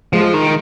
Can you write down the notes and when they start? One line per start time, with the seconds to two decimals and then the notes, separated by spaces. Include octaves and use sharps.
0.13 F3 G#3
0.34 D#3